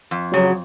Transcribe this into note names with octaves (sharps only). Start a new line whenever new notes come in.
F2
C#3 F#3